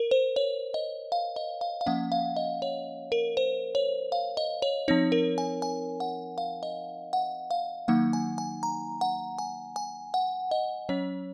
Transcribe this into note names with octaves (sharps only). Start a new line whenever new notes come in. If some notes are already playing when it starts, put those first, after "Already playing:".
Already playing: A#4
C5
C#5
D#5
F5
D#5
F5
F5
F3 A#3 C#4 F#5
F5
D#5
C#5
A#4
C5
C#5
F5
D#5
C#5
F3 C4 D#4 C#5
A#4
G#5
G#5
F#5
F5
D#5
F#5
F5
D#3 F#3 A#3 D#4 F#5
G#5
G#5
A#5
F#5
G#5
G#5
F#5
D#5
F#3 C#4 C#5